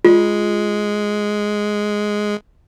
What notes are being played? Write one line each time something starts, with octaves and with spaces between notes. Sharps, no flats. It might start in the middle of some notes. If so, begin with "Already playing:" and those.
G#3 F4